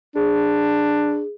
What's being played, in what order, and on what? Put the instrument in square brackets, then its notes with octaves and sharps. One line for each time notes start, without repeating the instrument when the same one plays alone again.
[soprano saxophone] D4 [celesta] G#4